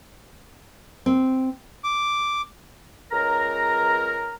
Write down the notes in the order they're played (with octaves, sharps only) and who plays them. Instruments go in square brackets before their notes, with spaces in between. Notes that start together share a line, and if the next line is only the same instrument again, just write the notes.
[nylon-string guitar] C4
[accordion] D6
[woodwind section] C#2 A#4 A#5